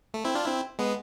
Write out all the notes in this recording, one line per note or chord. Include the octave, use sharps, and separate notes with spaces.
A3
C4 E4
D4 F4
C4 E4
G#3 B3